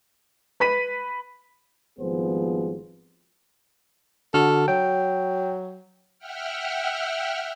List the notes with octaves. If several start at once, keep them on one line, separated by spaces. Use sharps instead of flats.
B4 B5 B6 D#7
G#1 F3 G3 B3 G#4 C5
D3 F#4 A4 F6
F#3 G5
E5 F#5 G5 F6